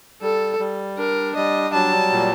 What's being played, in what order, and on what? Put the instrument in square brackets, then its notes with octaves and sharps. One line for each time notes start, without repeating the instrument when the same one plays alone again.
[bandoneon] G3 [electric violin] A4
[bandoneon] G3
[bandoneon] D4 [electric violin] A#4
[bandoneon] G3 [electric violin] D#5
[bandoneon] F#3 [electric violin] A5
[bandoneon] A#2